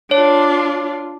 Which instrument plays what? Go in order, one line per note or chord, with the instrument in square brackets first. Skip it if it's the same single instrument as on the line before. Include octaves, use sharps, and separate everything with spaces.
[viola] D4 F4 [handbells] C#5